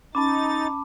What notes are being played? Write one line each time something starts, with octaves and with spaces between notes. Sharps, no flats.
C#4 D#4 A5 B5 D6 A6